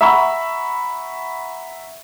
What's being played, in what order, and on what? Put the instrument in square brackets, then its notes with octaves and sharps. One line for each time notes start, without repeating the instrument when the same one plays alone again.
[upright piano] E5 F#5 A#5 B5 C#6 E6